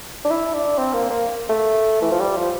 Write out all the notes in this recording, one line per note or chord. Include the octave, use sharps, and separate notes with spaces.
D4
E4
D4
C4
A#3
A#3
A3
E3
F3
G3
F3